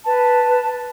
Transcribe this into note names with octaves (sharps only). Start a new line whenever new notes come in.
B4 A5